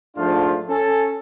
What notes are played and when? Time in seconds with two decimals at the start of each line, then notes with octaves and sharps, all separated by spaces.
0.17 G#2 F3 A3 D4 F4
0.69 C#4 A4